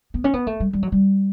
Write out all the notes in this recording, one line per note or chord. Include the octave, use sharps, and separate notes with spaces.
B3
C#4
B3
A3
G3
G3
F#3
G3